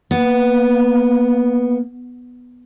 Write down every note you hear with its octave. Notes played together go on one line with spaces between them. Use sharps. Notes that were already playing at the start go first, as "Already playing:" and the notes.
A#3 B3